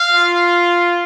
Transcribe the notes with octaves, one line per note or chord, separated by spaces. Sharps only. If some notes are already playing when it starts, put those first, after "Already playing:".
Already playing: F5
F4